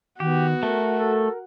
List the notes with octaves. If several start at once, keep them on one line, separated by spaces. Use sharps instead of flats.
D#3 B3 F#4 G4
A3 A#4
A4